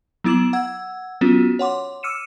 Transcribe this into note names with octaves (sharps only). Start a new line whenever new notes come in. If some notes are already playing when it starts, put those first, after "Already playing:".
F#3 B3 E4 D6 E7 F#7
F#5 E6 G#6
F#3 B3 C#4 F4 F#4
C#5 F#5 C6 D6
D6 E6 F6 C#7 D#7 E7